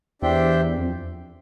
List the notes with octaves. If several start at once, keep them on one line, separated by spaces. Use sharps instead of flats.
E2 D4 G4 C5 E5 G5
F2